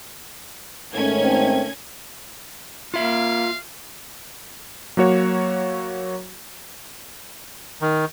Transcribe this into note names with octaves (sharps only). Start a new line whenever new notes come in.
G#2 D#3 A3 C#4 G#6
C4
A#3 F4 E5 F5
F#3 A#3 F#4 C#5
D#3